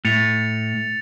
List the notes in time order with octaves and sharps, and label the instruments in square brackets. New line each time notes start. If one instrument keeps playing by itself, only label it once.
[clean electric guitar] A2 [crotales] A6 C#7 F7